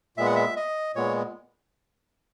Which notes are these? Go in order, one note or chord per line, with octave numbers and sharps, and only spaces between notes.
A#2 G#3 B3 E5
F#5
E5
D#5
A#2 G#3 B3 C#5